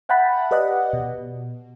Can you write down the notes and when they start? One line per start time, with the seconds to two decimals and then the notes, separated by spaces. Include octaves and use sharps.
0.09 E5 F#5 G5 A5 B5
0.51 G4 B4 D5 D#5 F#5
0.93 B2